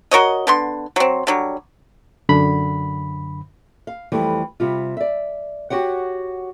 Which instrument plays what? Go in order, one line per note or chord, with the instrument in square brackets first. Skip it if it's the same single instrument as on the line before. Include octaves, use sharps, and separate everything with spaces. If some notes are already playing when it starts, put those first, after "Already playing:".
[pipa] F#4 A#4 C#5 D#5
D3 B3 C6
F#3 C4
D3 F#3 G3
[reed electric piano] F#2 D3 B5
[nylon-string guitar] F5
F2 E3 G3 A3
C3 G3 F4
D5 E5
F#4 G4 C#5 F#5